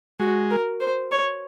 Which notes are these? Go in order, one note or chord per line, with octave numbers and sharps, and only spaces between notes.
G#3 F#4
A#4
C5
C#5